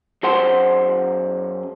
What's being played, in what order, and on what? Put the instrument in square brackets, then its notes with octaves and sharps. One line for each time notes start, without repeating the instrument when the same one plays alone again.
[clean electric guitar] F#2 G#4 C5 F#5 A5 C6